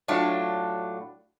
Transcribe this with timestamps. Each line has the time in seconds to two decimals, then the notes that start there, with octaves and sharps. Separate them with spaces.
0.08 A2 F#3 D4 F4